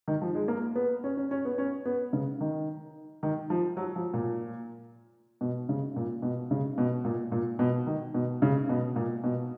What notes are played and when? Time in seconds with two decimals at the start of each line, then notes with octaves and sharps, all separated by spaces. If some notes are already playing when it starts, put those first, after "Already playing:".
0.08 D#3
0.22 F3
0.35 G#3
0.48 A#3
0.76 B3
1.04 C#4
1.17 C#4
1.31 C#4
1.45 B3
1.58 C#4
1.85 B3
2.13 C#3
2.41 D#3
3.23 D#3
3.50 F3
3.77 F#3
3.96 F3
4.14 A#2
5.41 B2
5.69 C#3
5.96 A#2
6.22 B2
6.51 C#3
6.78 B2
7.05 A#2
7.32 A#2
7.59 B2
7.87 D#3
8.14 B2
8.42 C#3
8.69 B2
8.96 A#2
9.24 B2